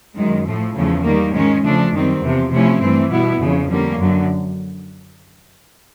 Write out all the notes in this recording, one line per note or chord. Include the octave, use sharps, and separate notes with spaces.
F#2 D#3 G#3
A2 F3 A3
E2 C#3 F3 A3
D#3 G3 A#3
G#2 D#3 G#3 C#4
C#3 F3 A3 D4
F#2 D#3 G3 C4
E2 C3 F3
C3 F3 A3 C#4 E4
G2 E3 A3 C4
B2 G3 B3 E4
F2 C#3 F3
D3 G3 A#3 C#4
F#2 D3 F#3